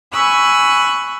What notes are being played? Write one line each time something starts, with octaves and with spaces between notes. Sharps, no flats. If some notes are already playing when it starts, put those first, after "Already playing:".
G#5 B5 C#6 E6 F#6